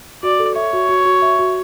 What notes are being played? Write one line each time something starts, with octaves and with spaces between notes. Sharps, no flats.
F#4 D5
A4
C#5 E5
F#4
F#4
F#4
E5
F#4